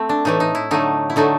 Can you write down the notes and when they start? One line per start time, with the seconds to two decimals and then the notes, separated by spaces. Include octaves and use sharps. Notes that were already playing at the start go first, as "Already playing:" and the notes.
Already playing: A3 C4
0.09 D4
0.25 A2 E3 A3 D#4
0.40 D#4
0.55 E4
0.71 D3 F#3 A3 D#4
1.10 E4
1.16 D3 F#3 A3 D#4